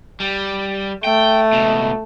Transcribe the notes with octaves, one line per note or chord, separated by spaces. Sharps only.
G3
A3 G5
C#2 B2